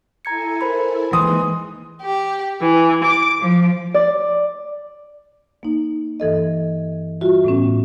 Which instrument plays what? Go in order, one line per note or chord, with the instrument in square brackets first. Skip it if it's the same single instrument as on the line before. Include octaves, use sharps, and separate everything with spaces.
[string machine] E4 A4 G#5 [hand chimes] A#5 G#6 C#7
[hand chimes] A#4 C5 B5
[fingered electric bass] E3 [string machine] G#3 A#3 D#4 [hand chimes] C6 [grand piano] D#6
[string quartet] G4
E3
D6
F3
[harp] D5
[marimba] A#3 D#4
G2 E3 A4 D#5
G3 F4 F#4 E5
A2 B3 C#4